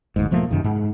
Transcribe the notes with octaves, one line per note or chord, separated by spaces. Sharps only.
F#1 D2 G#2
E1 F3 A3 A#3
F#2 C3 D#3
G#2